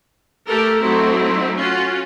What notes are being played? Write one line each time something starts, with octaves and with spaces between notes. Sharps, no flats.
A3 G4 A4 A#4
F#3 A3 C4 D#4 E4
C#4 F4 F#4